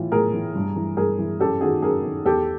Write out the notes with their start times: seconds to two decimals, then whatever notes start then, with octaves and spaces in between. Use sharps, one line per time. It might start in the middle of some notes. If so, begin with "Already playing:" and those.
Already playing: A2 E3 F4
0.12 A2 G#4 A#4
0.33 E3
0.55 G2
0.76 E3
0.97 G2 G#4 A#4
1.19 E3
1.40 F#2 G4 A4
1.61 D#3 F#4 G#4
1.82 F#2 G#4 A#4
2.04 D#3
2.25 E2 G4 A4